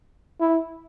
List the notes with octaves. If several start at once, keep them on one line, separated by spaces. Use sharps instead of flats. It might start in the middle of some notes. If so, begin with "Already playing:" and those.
E4